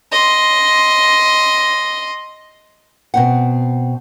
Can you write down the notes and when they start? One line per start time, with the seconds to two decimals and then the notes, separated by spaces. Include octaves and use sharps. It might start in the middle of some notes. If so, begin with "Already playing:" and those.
0.12 D#5 C6
3.14 B2 C4 F#5